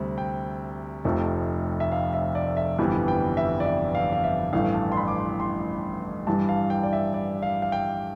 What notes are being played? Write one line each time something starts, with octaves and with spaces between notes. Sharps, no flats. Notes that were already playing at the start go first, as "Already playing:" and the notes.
Already playing: D2 C3 G3 C4
G5
F1 F2 C3 F3 A3
E5
F5
E5
D5
E5
G1 F2 E3 G3 B3
G5
E5
D5
E5
F5
F5
E5
A1 G2 E3 A3 F5
A5
C6
B5
D6
C6
C6
G2 E3 G3 A5
F5
G5
D5
E5
D5
F5
F5
G5